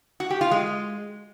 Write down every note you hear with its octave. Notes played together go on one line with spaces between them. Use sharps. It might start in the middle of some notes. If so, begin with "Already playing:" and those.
F#4
G4
F4
G#3